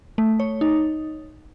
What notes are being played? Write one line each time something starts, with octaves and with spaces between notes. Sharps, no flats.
A3
C#5
D#4